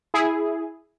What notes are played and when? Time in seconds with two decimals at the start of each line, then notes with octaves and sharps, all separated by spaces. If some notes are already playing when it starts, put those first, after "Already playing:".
0.14 E4 G#4